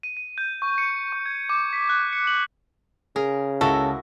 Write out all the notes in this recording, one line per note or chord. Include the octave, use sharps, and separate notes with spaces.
D#7
D#7
G6
C#6
C#7
C#6
G#6
D6
B6
F#6
C#7
F#7
C#3 G#4 A#4
C#2 E4 F#4 A4 A#4